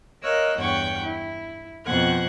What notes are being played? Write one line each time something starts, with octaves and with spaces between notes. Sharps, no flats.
A#4 C#5 D#5 F5 E6 F#6
E2 G2 C#5 F#5 G5 C#6
E4
F2 B2 C5 F#5 F#6 G#6